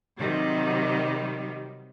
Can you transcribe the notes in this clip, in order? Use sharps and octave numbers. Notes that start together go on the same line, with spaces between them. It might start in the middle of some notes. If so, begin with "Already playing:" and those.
C3 D#3 F#3 G3